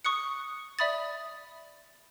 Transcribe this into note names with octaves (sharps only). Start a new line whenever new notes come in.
C#6 D#6 F#6 C#7
D5 E5 B5 D#6 A6